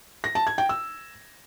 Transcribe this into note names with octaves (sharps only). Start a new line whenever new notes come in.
A#6
A5
G#6
G5
E6